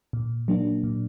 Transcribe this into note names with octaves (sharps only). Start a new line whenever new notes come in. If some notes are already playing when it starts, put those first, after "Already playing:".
A#2
F#3 A#3 D4
A#2